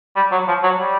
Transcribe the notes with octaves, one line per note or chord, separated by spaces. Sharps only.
G3
F#3
F3
F#3
G3